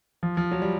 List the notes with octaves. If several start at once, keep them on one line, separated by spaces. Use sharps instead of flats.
F3
F3
F#3
G3